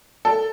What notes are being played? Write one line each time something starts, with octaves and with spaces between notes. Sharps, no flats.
A4